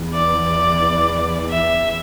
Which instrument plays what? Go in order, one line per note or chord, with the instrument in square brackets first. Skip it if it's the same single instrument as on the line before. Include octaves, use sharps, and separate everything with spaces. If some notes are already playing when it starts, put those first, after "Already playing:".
Already playing: [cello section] E2 E3
[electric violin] D5
E5